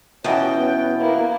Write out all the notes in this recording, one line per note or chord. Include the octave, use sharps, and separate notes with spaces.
E2 B2 C#4 F#4 G5
B3
A#3 B3 E4